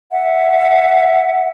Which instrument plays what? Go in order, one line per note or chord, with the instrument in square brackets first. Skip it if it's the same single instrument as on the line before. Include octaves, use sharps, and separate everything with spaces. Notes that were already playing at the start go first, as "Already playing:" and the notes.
[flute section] E5 F#5